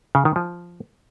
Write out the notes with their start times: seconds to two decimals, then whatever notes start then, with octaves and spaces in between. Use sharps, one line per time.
0.15 C#3
0.25 D#3
0.36 F3